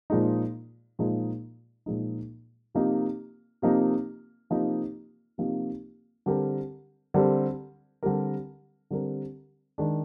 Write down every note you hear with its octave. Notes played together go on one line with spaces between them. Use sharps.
A#2 F3 G#3 D#4
A#2 F3 G#3 D#4
A#2 F3 G#3 D#4
C3 F3 A#3 D#4 G4
C3 F3 A#3 D#4 G4
C3 F3 A#3 D#4 G4
C3 F3 A#3 D#4 G4
D3 G3 C4 G4 A#4
D3 G3 C4 G4 A#4
D3 G3 C4 G4 A#4
D3 G3 C4 G4 A#4
D#3 G#3 D4